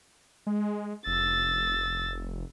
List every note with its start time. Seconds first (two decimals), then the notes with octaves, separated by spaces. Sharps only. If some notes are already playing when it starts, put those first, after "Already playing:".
0.47 G#3
1.07 F1 E6 A6